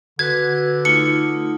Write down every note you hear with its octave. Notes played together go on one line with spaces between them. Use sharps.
D3 F#4 B4 G#6
A3 D#4 F4 C#7